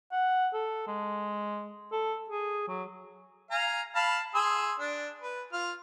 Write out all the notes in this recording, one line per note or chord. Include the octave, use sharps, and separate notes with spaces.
F#5
A4
G#3
A4
G#4
F#3
F5 G#5 A#5
F5 A5 B5
G#4 C6 E6
D4
B4
F4 F6